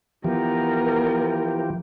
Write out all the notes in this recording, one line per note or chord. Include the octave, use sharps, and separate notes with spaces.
E3 F3 B3 G4 A#4